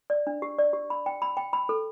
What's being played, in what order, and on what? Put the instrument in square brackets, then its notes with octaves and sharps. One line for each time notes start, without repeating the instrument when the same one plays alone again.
[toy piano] D5
D4
G4
D5
G4
B5
G5
B5
G5
B5
A4